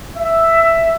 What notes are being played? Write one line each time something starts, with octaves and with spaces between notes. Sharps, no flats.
E5